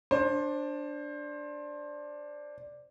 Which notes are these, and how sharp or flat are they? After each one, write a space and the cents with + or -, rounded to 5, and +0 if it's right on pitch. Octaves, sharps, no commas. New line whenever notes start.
D4 +0 C5 +20